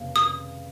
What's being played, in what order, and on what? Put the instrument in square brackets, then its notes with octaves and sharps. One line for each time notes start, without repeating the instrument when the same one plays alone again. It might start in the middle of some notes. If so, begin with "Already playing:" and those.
Already playing: [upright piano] F1 D#2 C#3
[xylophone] D#6